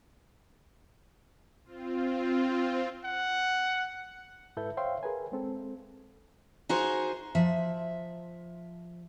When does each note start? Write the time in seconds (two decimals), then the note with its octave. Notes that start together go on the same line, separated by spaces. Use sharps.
1.65 C4 F4
3.05 F#5
4.57 G#2 E4 A4 B4 E5 G6
4.77 C5 C#5 E5 F5 G5 C6
5.03 G#4 A#4 B4 G#5
5.32 G#3 C4 A4
6.69 D#4 F#4 G#4 A#4 C5
7.35 F3 E5